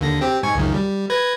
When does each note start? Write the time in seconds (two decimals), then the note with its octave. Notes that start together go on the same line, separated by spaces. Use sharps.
0.01 D#2 D3 A#6
0.21 C4 G4
0.43 G#2 G#5 C#6
0.55 C#2 F#2 D#3
0.74 G3
1.10 B4 G#6 A#6